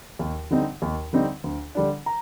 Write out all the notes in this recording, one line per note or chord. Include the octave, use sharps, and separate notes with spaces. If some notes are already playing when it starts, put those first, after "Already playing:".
D#2
D3 G3 C4 D#4
D#2
D3 G3 C4 D#4
D2
D3 G3 D4
A#5